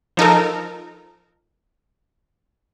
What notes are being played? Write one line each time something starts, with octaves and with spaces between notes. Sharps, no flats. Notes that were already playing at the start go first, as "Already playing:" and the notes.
F3 D#4 A4 A#4